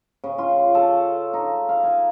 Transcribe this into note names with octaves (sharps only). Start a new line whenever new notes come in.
C#3
F4
A4
D#4
F5
G#5